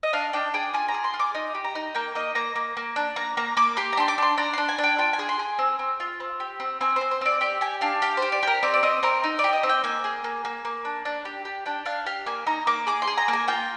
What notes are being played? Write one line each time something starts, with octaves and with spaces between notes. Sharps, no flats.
D#5
D4 F5
D4 G5
G#4 G5
F4 G#5
A#5
G#4
C6
F4
D6
D#4
G4
A#5
D#4
A#3 G5
A#3 D#5
A#3 A#5
A#3
A#3
D4
A#3 A#5
A#3 A#5
A#3 D6
G4 C6
A#5
D4 C6
D6
D4 C6
D4 A#5
D4 C6
G#5
D4
G5
F4 G5
G#5
G#4
C6
G#4
C4
C4
F4
C4
G4
C4
C4 G#5
C4 C5
C5
C4 D5
G4 D5
G4 G#5
D4 F5
G4 F5
C5
G4
D5
G4 A#4
C4 D5
D5
C4 D#5
C4 A#4
D#4
D5
G4
D#5
C4
G5
A#3 G#5
G#4
A#3
A#3
A#3
D4
D4
G4
G4
D4 G5
D4 F5
G4 F5
A#3 G#5
D#4 A#5
A#3 D6
G#4 D6
C6
G#4
A#5
A#3
G#5
F4 G5